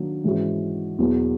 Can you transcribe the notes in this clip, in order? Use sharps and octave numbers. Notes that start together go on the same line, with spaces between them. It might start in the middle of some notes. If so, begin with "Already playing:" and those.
Already playing: D#3 F#3 A#3 D4
G#2 E3 G#3 C#4 F#4
E2 B2 F#3 A#3